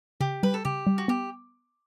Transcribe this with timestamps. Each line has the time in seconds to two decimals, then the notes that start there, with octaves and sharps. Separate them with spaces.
0.20 C#3 G4
0.43 G3 B4
0.54 A4
0.65 C#3 G4
0.87 G3
0.98 F#4
1.08 B3 G4